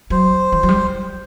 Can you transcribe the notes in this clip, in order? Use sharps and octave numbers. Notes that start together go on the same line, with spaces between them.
F#3 C5
E3
F#3
G3